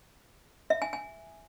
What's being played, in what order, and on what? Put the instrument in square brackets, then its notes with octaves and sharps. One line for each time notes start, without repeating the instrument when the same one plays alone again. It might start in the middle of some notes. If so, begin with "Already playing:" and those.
[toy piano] E5
G#5
G#5